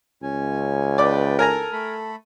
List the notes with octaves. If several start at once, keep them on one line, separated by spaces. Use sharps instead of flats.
C#2 C#4 G#5
B4 D5 G5 D6
A4 A#4 G#5 A#5
A3 A4 B5